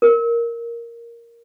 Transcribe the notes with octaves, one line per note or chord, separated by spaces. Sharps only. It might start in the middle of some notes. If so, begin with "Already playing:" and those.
A#4